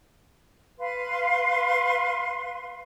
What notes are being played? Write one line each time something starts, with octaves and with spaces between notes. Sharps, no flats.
B4 F5 C6